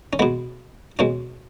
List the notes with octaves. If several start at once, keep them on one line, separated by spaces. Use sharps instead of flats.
C#4
B2 G#3 B3
B2 G#3 C#4